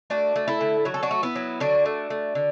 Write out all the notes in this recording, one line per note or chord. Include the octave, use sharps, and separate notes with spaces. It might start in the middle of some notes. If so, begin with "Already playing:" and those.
A3 D4 F#4
A3
E4 A4
D3
F#3 F#4
A4
D4 F#4
A3
B3 E4
F#3
D3 D4 F#4
A3
A3
D3